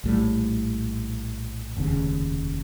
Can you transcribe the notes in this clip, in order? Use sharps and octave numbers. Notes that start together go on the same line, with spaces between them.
A#1 A2 E3 G3
F1 D#2 C#3